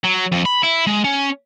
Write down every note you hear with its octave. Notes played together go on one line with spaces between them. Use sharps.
F#3
F2
B5
E4
G#3
C#4